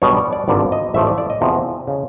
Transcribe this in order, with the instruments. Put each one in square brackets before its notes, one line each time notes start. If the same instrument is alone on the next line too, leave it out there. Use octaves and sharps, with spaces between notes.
[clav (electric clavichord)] B1 B2 G3 B3 D4 C#5
D5
D5
G#1 G2 D3 F3 A#3 D5
D#5
A1 G#2 F3 A3 C4 E5
D5
D5
D#5
E2 C3 F3 A3
C#3